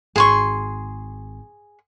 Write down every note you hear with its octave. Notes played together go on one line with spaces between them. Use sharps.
G#1 G#4 C6 C#6